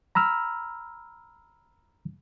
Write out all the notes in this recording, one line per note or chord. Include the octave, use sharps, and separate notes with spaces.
A#5 B5 E6 F6